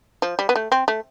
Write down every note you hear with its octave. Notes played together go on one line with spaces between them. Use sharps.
F3
G3
B3
A3
C4
A3